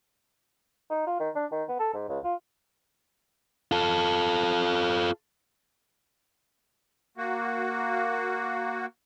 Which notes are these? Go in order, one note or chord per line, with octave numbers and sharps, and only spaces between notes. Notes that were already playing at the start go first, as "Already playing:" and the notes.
D#4
F4
D#3
D4
D#3
B3
A4
G#2
C#2
F4
F4 A4
A#3 F#4